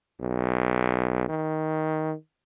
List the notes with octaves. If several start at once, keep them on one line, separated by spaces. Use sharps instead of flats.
B1
D#3